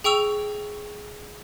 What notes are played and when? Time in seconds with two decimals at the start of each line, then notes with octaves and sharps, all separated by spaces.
0.04 G#4 G5 C#6 E6 F7